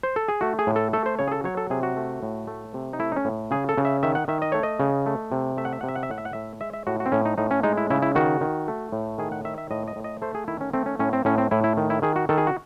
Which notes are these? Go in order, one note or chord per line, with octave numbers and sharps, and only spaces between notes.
C5
A4
G#4
A3 F#4
G#4
A2
A4
A3 A4
C5
C#3 C#5
G#4
A4
F#3 C#5
A4
C3 G#4
F#4
A3
A2
A3
C3
D#4
A3 E4
D#4
C#4
A2
C#3 G#4
A4
C#3
E5
D#3 E5
F#5
D#3 E5
D#5
A3 C#5
D#5
C#3
A3
C3
A3 E5
F#5
E5
C3 F#5
E5
F#5
E5
A2 F#5
E5
F#5
A2 E5
G#3 E5
E5
A2 F#4
F#4
C4
A2 C#4
D#4
A2 D#4
C#4
G#3 D#4
E4
C#3 E4
E4
D#3 F#4
D#3
A3
A2
D#3 G#4
F#5
D#3 E5
E5
A2 D#5
D#5
A2
D#5
A3 C5
G#4
D#3 E4
C#4
A3 C4
C#4
A2 C#4
C4
A2 C#4
C4
A2 E4
E4
D#3
E4
D#3 G#4
F#4
D#3 A4
G#4
F#4